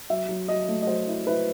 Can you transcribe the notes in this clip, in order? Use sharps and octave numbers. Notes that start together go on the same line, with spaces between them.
F#3 E5
F#3
F#3 D#5
A3
D#5
F#3 C5
E4
E4 B4